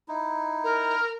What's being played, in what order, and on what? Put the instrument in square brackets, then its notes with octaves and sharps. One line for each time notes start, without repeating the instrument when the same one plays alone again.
[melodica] D#4 E4
[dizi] A#4